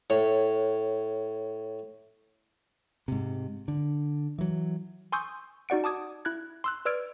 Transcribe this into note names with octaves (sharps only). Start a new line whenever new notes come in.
A2 C#5
G#2 C3
D3
E3 F#3
G#5 C6 C#6 D#6 E6 G6
D#4 F#4 D5 F#5 D7
A5 D6 D#6 G#6
E4 F#6 G#6
C6 E6 F#6
B4 D5 E6 F6 G#6 D7